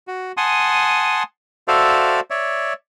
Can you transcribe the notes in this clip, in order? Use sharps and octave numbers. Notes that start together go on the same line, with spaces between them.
F#4
F#5 G#5 A5 C6 D#6
F#4 A4 C5 D5 E5 F5
C#5 D5 E5